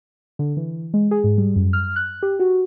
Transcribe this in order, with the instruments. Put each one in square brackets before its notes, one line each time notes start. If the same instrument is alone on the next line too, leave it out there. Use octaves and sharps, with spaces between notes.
[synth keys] D3
E3
G#3
G#4
G#2
G3
F#2
F6
F#6
G4
F#4